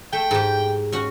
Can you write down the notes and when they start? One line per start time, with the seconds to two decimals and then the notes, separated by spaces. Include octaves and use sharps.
0.13 A3 G5
0.31 G#2 G4
0.92 C#4 F#4